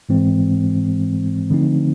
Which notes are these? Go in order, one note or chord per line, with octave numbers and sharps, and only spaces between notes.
G#2 E3 G#3 C4
D3 F3 A3 C4 D#4